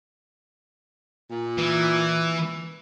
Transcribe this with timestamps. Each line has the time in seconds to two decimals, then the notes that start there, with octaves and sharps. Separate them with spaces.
1.30 A#2
1.58 E3